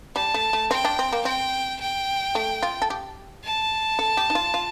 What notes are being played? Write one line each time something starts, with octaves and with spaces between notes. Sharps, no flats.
G3 A5
A3
A3
C4 G5
D4
C4
A#3
C4 G5
G5
A3
F4
A4
G4
A5
A4
G4
D#4
F4
F4